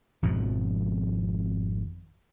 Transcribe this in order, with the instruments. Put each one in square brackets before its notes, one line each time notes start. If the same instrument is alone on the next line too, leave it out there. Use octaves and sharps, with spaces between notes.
[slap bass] G#1 F2 B2 F3